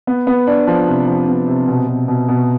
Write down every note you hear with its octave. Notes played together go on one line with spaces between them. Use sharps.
B3
B3
D4
F3
C3
F3
B3
C3
B2
B2
B2
B2